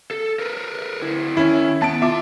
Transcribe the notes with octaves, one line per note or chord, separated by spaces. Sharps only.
A4
A#4 B4
D2 E4
D#3 C#4 E4
B3 A5 D7
F4 E5 D6